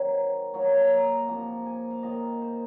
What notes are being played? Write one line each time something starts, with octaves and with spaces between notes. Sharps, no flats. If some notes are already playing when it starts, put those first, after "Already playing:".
Already playing: D#3 F#3 C4 D#4
A#2 F#3 A#3 F4 C#5
D#5
F#5
A#5
C3 F3 A#3
G#5
F5
D#3 A#3 F4 D#5
C5